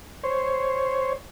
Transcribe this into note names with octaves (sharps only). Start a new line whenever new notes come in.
C5 C#5